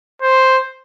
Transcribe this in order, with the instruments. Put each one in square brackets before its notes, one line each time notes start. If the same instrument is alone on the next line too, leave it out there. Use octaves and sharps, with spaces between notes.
[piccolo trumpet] C5